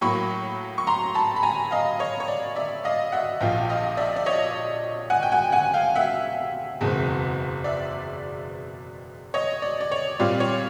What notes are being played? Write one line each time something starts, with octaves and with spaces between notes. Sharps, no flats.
A2 F#3 A#3 B5 C#6
C#6
A#5 C6
A5 B5
B5
G#5 A#5
D#5 F5
C#5 D#5
C#5
D5
D5 E5
D#5 F5
E5 F#5
A#1 A#2 F3 F5 G5
D#5 F5
D5 E5
D5
C#5 D#5
F#5 G#5
G5
F#5 G#5
F#5 G#5
F5 G5
E5 F#5
F#1 E2 B2 G#3 C4
D5 E5
C#5 D#5
D5
D5
C#5
A#2 G3 C4 F4 D5
C#5